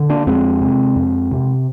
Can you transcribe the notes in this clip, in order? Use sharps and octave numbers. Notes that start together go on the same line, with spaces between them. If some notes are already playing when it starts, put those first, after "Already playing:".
Already playing: D3
A#3 D4
F2 G#3 C4
C3
F2
C3